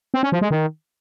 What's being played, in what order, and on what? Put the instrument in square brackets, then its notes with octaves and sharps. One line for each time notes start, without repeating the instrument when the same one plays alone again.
[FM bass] C4
C#4
F3
G#3
D#3